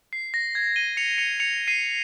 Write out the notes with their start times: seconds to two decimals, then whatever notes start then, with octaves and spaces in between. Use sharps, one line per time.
0.13 C7
0.34 A#6
0.55 G#6
0.76 D#7 G7
0.97 C#7 F7
1.18 C#7 F7
1.40 C#7 F7
1.68 C7 D#7